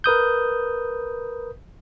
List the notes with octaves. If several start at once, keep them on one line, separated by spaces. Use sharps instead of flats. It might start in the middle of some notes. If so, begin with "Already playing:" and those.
A#4 B4 D#6 G6